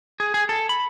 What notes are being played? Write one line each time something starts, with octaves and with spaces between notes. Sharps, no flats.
G#4
G#4
A4
B5